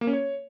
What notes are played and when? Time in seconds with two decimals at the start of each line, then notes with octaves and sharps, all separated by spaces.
0.01 A#3
0.07 C#4
0.13 C#5